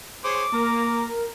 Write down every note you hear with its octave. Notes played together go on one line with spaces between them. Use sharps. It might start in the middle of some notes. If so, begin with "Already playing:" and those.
G#4 C5 C#5 D6
A#3 A#4 A#5